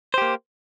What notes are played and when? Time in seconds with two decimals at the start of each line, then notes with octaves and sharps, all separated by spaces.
0.14 C5
0.18 G4
0.22 A#3